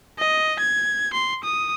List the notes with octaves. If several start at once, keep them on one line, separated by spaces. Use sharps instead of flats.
D#5
G#6
C6
D#6